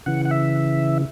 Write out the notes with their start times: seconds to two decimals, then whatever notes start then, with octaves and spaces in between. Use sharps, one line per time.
0.06 C#3 E3 F#5
0.25 F#5
0.31 E5